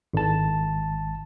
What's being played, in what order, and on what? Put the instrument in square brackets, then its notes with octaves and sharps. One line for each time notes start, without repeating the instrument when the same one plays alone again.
[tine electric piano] G#1 A5